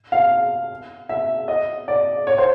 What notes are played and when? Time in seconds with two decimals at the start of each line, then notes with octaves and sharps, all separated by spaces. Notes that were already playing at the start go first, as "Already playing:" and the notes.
0.12 F5
1.09 E5
1.48 D#5
1.88 D5
2.27 C#5
2.38 C5